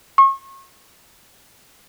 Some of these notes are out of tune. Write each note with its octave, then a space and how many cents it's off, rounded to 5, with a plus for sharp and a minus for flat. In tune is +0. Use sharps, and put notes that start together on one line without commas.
C#6 -35